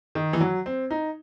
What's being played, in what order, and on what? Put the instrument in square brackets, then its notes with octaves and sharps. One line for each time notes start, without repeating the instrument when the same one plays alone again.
[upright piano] D#3
E3
F#3
C4
D#4